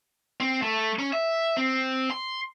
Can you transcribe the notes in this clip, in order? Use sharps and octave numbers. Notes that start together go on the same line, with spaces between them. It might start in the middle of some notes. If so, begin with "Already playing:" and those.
C4
A3
C#4
E5
C4
C6